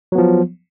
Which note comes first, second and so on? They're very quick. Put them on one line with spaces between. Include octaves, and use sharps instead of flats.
F#3 B3 F3